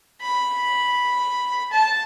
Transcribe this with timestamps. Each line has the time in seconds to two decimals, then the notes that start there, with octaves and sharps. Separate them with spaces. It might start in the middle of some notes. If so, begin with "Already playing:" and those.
0.21 B5
1.72 A5